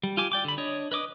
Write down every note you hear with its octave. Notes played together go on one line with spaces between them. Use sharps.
G3
F4 G4 G#5 D6
D5 G5 D6
D3 B5
D4 C#5 D#5
B4 D#5 D6 D#6